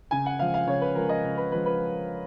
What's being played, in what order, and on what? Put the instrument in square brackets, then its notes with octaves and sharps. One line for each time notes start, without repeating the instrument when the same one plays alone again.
[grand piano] C#3 G#5
F#5
F3 G#3 F5
F5
C#3 C#5
B4
F3 G#3 A#4
D#5
C#3
B4
F3 G#3 B4
B4